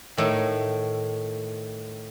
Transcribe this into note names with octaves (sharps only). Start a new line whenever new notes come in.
A2 D#3